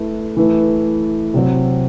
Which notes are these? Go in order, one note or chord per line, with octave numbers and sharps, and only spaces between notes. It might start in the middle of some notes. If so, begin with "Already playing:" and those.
Already playing: A3 E4 B4
E3 A3 E4 B4
C3 F#3 C4